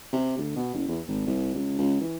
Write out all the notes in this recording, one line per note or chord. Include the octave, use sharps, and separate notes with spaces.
C3
D2
B2
F#1
E2
G#1
C2
C#2
C#2
E3